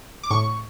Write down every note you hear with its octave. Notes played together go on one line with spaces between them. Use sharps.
D6
A2 C#6